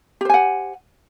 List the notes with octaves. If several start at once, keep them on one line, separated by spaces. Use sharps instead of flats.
G4 C5 F#5 G#5